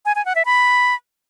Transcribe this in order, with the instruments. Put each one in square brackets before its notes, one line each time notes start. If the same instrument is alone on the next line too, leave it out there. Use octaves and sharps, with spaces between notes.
[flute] G#5
G#5
F#5
E5
B5